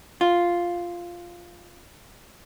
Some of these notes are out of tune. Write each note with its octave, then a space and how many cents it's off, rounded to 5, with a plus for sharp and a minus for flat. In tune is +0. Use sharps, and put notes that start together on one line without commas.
F4 +0